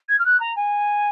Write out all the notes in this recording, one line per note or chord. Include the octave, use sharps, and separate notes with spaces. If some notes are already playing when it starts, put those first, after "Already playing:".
G#6
F6
F#6
A#5
G#5